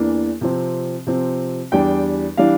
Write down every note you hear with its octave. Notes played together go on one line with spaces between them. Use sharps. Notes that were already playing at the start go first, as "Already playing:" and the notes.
Already playing: E2 E3 A#3 D4
C3 F3 C4
C3 F3 C4
E2 E3 G3 D4 G5
E3 G3 D4 F5